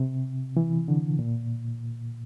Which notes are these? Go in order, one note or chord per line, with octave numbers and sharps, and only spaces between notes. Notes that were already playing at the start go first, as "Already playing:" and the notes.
Already playing: C3
E3
D3
A#2